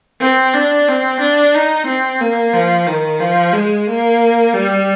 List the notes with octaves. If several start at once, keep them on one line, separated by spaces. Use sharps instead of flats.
C4
D4
C4
D4
D#4
C4
A#3
F3
D#3
F3
G#3
A#3
G3